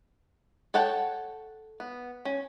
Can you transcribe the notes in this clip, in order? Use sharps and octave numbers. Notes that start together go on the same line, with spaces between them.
A4 C#5 F#5 G5 A5
B3
C#4